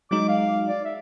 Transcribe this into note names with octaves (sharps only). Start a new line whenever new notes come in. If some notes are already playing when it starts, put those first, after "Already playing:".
F#3 G#3 D#4 D6
F5
D5
E5